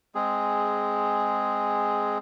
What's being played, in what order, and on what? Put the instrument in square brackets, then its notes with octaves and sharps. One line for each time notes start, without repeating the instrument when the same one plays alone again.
[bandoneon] G#3 C4 G#4